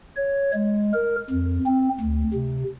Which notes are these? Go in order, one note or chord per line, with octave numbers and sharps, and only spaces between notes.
C#5
G#3
A#4
F2
C4
D2
C3